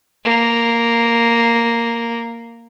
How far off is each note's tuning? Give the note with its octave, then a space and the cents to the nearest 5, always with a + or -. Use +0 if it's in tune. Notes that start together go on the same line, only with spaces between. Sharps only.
A#3 -5